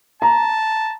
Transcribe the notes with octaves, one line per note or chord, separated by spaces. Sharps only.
A5 A#5